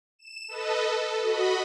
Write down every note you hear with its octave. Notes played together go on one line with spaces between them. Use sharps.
E7
A4 B4 D#5
A4
F#4 D#5 B5